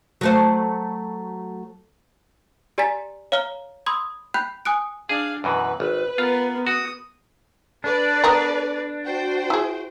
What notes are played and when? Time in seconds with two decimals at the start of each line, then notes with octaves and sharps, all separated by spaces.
0.21 F#3 A3 C5
2.78 G4 D5 G#5 A#5 A6 B6
3.32 C#5 F5 A#5 F6 G7
3.86 B5 C6 D#6 E6 G#6
4.34 G5 B5 F#6 G6 B6
4.65 G#5 D#6 F#6 D7
5.09 D4 G#4 F5
5.44 F#2 B2 E3 B4
5.80 G#1 B4
6.18 B3 F4 A#4
6.67 F#4 D#6
7.84 D4 A4 B4 D5
8.24 B3 A#4 A#5
9.06 F#4 C5 G5
9.50 E4 G#4